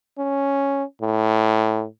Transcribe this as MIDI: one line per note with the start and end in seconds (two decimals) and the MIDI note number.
0.18 0.84 61
1.02 1.85 45